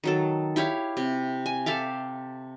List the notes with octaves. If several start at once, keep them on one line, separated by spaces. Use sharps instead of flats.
D#3 F#3 A4
E4 G4 C#5 F5
C3
G#5
G4 A4 E5 F5